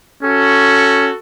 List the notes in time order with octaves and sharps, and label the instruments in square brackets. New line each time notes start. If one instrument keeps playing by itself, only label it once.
[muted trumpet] C#4 [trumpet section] F#4 A4